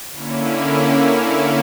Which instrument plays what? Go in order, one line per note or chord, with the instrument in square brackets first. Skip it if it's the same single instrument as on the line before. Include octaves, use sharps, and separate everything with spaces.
[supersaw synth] D3 A#3 C#4 E4